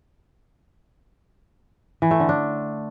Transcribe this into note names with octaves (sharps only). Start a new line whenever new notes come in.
E3
A3
D3
D4